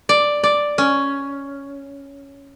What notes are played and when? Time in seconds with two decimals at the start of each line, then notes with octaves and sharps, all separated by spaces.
0.09 D5
0.44 D5
0.78 C#4